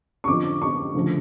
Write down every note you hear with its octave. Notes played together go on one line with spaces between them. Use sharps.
C#6
F2 D3 F3 D6
C#6
D2 C#3 F3